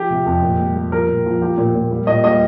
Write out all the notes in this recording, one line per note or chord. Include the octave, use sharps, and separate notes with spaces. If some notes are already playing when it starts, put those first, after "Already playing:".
Already playing: F3 G4
C3
F2
A#2
G3
G3
F3 A#4
A#2
F3
F3 G4
A#2
A#2
G3
A#2 D#5
G3 D#5